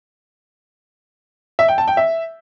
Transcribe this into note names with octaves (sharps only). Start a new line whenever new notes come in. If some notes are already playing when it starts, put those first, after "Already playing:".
E5
G5
A5
G5
E5